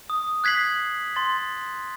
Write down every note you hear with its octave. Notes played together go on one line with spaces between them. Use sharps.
D#6
F#6 G#6 B6 C7 F#7
C6 A6